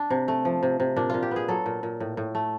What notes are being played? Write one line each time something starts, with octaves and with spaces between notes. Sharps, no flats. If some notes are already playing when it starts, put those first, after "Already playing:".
Already playing: D4
C3
A3
F3
C3
C3
A#2 D4
A#2 F4
G4
B3 G#4
F#3 A4
A#2
A#2
A2
A2
A3